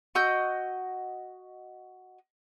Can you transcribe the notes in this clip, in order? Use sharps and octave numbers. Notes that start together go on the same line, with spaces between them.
F#4 D#5 E6 G6